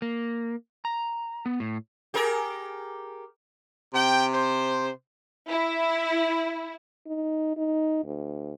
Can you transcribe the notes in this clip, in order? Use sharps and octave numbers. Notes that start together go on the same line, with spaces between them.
A#3
A#5
B3
A2
G4 G#4 A#4
C3 G5
C5
E4
D#4
D#4
D2